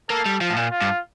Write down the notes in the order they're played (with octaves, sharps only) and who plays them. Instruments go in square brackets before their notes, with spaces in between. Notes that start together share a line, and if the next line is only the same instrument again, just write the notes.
[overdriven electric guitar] A#3 [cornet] A4
[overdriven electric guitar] G3
[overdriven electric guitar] F3 [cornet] F4
[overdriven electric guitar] A2
A#2
[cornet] F4
[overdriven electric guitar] G2